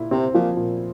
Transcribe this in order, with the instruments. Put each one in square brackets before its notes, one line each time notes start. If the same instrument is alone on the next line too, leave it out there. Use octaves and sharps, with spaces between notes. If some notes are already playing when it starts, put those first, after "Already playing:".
Already playing: [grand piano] A#2 E4
[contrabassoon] C3 [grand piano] C4
[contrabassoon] A#2 [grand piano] F3
[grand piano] A#2